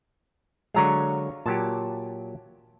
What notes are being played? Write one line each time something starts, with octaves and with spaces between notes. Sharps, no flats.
D3 F#3 G#3 F5 A#5 C#6
A#2 F#3 G4 A5